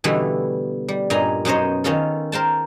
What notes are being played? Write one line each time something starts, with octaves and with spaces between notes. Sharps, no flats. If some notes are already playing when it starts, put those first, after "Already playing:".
B2 D3 E3 G3 A3 E4
G3
G2 A#2 D#5 G#5 A#5
F#2 B2 D#4 C5 C#5 D#5
D#3 C#4 F4 A4
A#4 C5 G5 A5